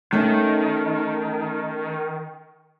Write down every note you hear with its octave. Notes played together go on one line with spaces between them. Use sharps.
D#3 A3 C#4 D#4